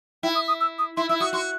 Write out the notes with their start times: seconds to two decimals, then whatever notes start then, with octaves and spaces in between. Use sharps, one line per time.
0.23 E4 G5
0.35 D#6
0.48 D#6
0.61 E6
0.79 D#6
0.97 E4 C6
1.09 E4 E6
1.20 F#4 D#6
1.33 F#4 C6